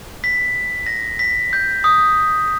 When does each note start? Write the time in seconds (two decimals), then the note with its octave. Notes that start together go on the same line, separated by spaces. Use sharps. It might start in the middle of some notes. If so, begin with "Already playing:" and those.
0.24 B6
0.86 A#6
1.19 B6
1.53 G6
1.84 D#6